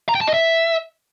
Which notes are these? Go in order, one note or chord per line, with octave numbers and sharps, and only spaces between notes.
A#5
G5
A5
D#5
E5